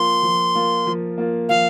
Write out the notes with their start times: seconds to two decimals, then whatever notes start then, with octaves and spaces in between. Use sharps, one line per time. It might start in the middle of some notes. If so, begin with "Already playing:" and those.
Already playing: F3 A#3 F4 C6
0.23 F3
0.55 A#3 F4
0.87 F3
1.18 A#3 F4
1.49 F3 F5